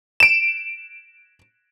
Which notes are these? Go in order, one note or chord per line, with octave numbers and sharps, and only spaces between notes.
D7 E7